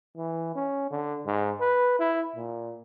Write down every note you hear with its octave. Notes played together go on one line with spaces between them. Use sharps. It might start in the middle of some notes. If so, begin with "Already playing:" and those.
E3
C#4
D3
G#2
B4
E4
A#2